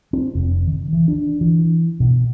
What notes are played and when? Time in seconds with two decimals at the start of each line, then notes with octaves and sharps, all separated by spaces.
0.13 C4
0.35 F1
0.67 D#3
0.93 E3
1.08 D4
1.41 E3
2.00 B2